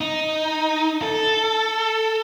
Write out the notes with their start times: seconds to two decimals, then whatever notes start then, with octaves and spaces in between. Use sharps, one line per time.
0.01 D#4
1.02 A4